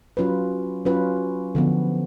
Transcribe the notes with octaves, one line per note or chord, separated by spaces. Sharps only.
F#3 C#4 F4 B4
F#3 C#4 F4 B4
D3 F3 B3